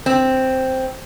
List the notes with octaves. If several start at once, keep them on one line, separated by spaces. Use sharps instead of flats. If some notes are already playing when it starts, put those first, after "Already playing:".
C4